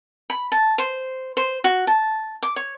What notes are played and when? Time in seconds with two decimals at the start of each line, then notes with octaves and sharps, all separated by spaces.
0.30 B5
0.52 A5
0.78 C5
1.37 C5
1.64 F#4
1.87 A5
2.43 D6
2.56 C#5